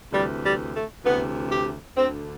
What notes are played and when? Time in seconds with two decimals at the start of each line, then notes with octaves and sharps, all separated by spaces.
0.11 D2 C3 E3 G3
0.42 G3
0.73 A3
1.03 D2 C3 E3 B3
1.50 G4
1.96 D2 D3 C4